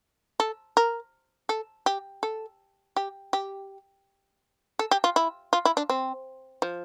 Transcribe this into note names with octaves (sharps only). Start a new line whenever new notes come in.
A4
A#4
A4
G4
A4
G4
G4
A4
G4
F4
E4
F4
E4
D4
C4
F3